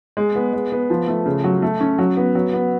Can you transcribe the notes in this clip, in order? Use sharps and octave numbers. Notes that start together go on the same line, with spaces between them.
G#3
B3
G#3
B3
F3
A3
C#3
F#3
A3
C#4
F#3
B3
F#3
B3